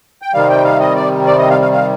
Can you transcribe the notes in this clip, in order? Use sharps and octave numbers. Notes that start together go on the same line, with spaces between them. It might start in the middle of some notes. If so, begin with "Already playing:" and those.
G5
C3 D#3 G3 F5
G5
F5
D#5
D5
D5
D#5
F5
F5
F5